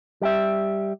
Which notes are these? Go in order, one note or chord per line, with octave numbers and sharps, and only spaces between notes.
G3 G4 E5